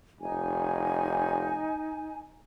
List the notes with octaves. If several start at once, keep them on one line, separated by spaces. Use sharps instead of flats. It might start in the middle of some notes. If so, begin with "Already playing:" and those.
F1 D#4 G#5